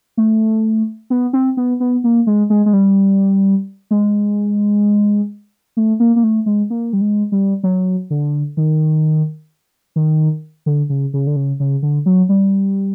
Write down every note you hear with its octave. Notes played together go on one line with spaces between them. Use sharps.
A3
B3
C4
B3
B3
A#3
G#3
G#3
G#3
G3
G#3
A3
A#3
A#3
A3
G#3
A#3
G3
G#3
G3
F#3
D3
D#3
D#3
D3
C#3
C#3
D3
C#3
C#3
D3
F#3
G3